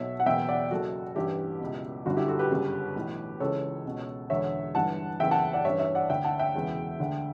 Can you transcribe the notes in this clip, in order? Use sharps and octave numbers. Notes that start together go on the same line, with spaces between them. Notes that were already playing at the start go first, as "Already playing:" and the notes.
Already playing: B1 B2 C#5 E5
F#5
F#1 E2 B2 E5 G5
D5 F#5
F#1 F#2 C#3 F#4 A4
A1 G2 E3 E4 G4
C#2 B2
G1 F#2 D3 F#4
E4 G4
F#4 A4
G4 B4
G1 F#2 C#3
B1 A2 E3
C#2 C#3 E3 A4 C#5
C#2 B2
E1 E2 D3 C#5 E5
G1 G2 E3 F#5 A5
F#1 E2 C#3 E3 E5 G5
F#5 A5
D5 F#5
A1 G2 E3 C#5 E5
C#5 E5
D5 F#5
D2 D3 E5 G5
F#5 A5
E5 G5
E1 E2 C#3 E3
D2 D3